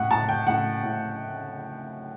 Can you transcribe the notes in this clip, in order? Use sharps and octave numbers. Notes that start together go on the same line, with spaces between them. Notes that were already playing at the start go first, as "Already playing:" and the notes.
Already playing: A2 F#5
A2 A5
G5
A2 F#5
A2